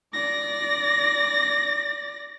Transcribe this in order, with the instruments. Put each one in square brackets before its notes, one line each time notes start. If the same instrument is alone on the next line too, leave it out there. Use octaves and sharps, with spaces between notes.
[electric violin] D5 A#6